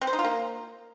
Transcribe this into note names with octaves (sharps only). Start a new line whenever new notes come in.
C4
C5
D#4
F4
A#3